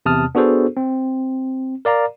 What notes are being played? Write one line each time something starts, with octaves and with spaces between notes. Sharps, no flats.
E2 C3 A5 D#6 F6
B3 D4 F#4 G#4 A4 C5
C4
A#4 D5 F5 A#5